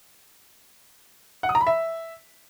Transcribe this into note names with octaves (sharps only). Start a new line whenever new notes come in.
F#5
D#6
A#5
B5
E5